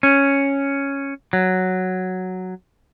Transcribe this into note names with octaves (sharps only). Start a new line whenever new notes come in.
C#4
F#3